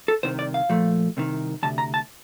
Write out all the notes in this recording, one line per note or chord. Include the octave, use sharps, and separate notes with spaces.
A4
C2 C3 D#3 C5
D5
F5
A#2 F3 A3
C2 C3 D#3
D2 C3 A5
A#5
A5